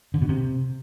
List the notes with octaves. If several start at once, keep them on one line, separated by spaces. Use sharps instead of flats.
D3
B2
C3